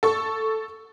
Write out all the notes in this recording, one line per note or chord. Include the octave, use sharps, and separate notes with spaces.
A4 C#6